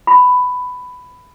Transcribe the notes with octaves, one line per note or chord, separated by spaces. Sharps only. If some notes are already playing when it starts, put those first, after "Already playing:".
B5